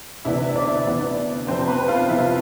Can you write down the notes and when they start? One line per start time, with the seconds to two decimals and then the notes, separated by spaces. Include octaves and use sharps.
0.25 D2 C3 E3 B3 D4 E4 E5
0.56 D4 D5
0.86 D2 C3 E3 B3 D4
1.47 F2 C3 F3 B3 C4 C5
1.68 B3 B4
1.88 F4 F5
2.09 F2 C3 F3 B3 E4 E5